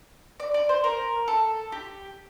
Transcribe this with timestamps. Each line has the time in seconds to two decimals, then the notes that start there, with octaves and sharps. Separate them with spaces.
0.40 D5
0.54 D5
0.69 C5
0.84 A#4
1.28 A4
1.72 G4